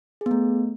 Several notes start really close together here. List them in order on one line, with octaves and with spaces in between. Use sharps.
G#4 B3 A3